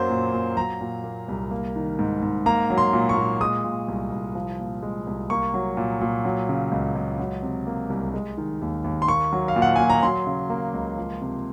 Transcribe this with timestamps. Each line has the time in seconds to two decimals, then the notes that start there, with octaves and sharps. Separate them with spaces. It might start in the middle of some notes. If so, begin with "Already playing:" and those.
Already playing: F#2 F#3 A#3 C5
0.10 A#2
0.34 A#2
0.57 F#3 A#5
0.81 A#2
1.04 A#3
1.28 C2
1.51 A#3
1.76 D#3
1.99 G#2
2.22 G#2
2.46 A#3 A#5
2.70 F#3
2.78 C6
2.93 A#2
3.09 C#6
3.17 A#2
3.41 G#3 D#6
3.64 A#2
3.88 C2
4.12 C2
4.35 F3
4.60 A#2
4.83 G#3
5.07 C2
5.30 A#3 C#6
5.54 F#3
5.77 A#2
6.01 A#2
6.25 F#3
6.49 C#3
6.72 C#2
6.95 C#2
7.19 F#3
7.43 C3
7.67 A#3
7.90 C2
8.14 G#3
8.38 D#3
8.62 D#2
8.84 D#2
9.02 C6
9.08 A#3 C#6
9.33 F#3
9.48 F5
9.56 A#2
9.62 F#5
9.76 A#2 G#5
9.90 A#5
10.03 F#3 C6
10.27 C#3
10.50 A#3
10.74 C#2
10.97 F3
11.22 C3